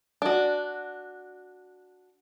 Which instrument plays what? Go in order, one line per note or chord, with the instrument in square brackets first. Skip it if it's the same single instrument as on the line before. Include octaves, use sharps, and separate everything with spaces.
[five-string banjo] D4 F#4